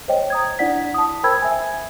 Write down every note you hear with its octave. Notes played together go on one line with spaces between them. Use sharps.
C5 C#5 D#5 G5
A#5 D#6 G#6
D4 E4 D5 F#5 B6
A5 D#6
A#4 C5 G5 B5 E6 G#6
E5 G#5